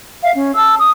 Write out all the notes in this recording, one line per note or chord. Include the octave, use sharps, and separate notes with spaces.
E5 F5
C#4
A5 E6
D#6